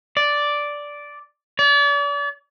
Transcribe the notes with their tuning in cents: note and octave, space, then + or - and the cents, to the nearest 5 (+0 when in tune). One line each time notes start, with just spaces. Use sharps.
D5 -5
D5 -40